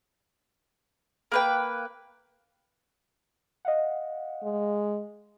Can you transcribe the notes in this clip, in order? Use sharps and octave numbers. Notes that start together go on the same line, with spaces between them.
A#3 B4 G5
D#5 F5 F#5
G#3